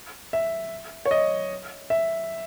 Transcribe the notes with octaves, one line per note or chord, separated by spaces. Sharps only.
E5
C#5
D#5
E5